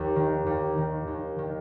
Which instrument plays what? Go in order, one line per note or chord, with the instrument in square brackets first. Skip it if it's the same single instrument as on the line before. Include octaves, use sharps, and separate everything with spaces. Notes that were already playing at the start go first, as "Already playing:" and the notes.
Already playing: [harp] D#2 G4
D#3
D#2
D#3
D#2
D#3